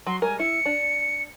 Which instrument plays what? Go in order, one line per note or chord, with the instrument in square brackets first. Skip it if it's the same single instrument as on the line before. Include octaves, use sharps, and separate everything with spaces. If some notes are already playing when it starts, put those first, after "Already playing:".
[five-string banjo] F#3 [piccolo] C6
[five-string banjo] G3 G#3 A#4 [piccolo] G#5
[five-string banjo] E4 [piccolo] C#7
[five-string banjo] D4